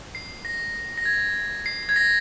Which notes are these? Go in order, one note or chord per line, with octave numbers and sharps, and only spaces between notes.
C7
A#6
A#6
G#6
C7
G#6
A#6